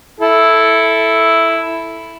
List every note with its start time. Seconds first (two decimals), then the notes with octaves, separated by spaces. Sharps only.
0.20 E4 A4